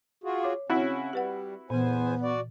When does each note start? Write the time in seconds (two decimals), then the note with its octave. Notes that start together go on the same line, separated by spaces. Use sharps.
0.24 F4 F#4 G#4
0.43 C#5 D6
0.70 C#3 C4 C#4 E4 F#4
1.13 G3 G4 B4 F#5
1.70 E2 A#2 E3 B3 C5 G#5
2.23 F#4 D5